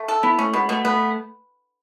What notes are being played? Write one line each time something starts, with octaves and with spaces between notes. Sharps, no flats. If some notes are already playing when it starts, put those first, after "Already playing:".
Already playing: A3
A4
B3 E4
A3 C#4
B2 G#3
B2 A3
A3 B3